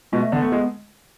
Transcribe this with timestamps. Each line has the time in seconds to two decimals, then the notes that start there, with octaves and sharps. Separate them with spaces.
0.12 B2 G#3
0.22 A3
0.32 D3 B3
0.42 A3
0.52 G#3